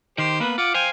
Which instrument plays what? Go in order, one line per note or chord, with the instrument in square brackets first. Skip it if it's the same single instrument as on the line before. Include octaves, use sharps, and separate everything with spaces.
[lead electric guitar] D#3 [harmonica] G4 C5
[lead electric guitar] A#3 B3 [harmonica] B4
[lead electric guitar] F4 [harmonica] F#5 D6
[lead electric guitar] C5 F5 [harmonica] G5 G#5